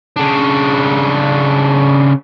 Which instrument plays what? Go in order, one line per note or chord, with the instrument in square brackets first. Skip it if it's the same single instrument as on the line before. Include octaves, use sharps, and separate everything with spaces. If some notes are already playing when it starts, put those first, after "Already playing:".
[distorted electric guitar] C#3 D4